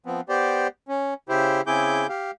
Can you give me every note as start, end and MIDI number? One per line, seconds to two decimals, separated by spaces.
0.06 0.21 53
0.06 0.21 59
0.06 0.21 60
0.29 0.68 59
0.29 0.68 67
0.29 0.68 72
0.29 0.68 74
0.88 1.14 61
1.29 1.61 49
1.29 1.61 64
1.29 1.61 67
1.29 1.61 72
1.67 2.07 49
1.67 2.07 60
1.67 2.07 64
1.67 2.07 68
1.67 2.07 86
1.67 2.07 91
2.09 2.31 67
2.09 2.31 77